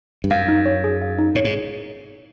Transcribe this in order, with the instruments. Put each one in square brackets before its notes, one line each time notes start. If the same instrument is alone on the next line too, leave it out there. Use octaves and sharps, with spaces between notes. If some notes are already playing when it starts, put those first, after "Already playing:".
[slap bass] G2
[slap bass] F#2 [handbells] F5
[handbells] D#4
C#5
G#4
F5
D#4
[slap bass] A2 [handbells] C#5
[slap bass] G#2
[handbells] G#4